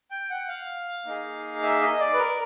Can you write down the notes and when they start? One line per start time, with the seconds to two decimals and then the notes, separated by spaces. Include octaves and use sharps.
0.11 G5
0.30 F#5
0.48 F5
1.06 A#3 D#4 G#4
1.63 E5
1.81 D#5
2.00 D5
2.13 B4
2.19 A#4